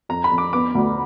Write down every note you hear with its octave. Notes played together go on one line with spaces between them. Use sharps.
F2 A#5
B5
F2
D6
B3 D6
D2